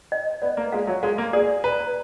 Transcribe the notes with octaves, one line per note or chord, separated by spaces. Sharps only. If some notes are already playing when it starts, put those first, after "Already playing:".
D#5
B3 D5
A#3
G#3 F5
F#3
G#3 F5
A#3
G#4 D5
B4 A#5